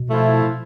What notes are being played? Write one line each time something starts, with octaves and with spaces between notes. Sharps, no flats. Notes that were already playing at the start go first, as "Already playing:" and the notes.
Already playing: B2
F3 A3 E4